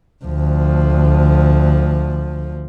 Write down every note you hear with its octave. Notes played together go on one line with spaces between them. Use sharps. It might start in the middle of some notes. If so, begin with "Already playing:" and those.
D2 F3